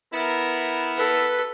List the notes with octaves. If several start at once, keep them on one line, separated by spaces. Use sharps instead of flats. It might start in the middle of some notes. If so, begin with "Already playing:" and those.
B3 E4 A#4
A4 B4